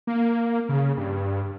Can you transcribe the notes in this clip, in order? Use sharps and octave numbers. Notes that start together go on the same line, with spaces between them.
A#3
C#3
G2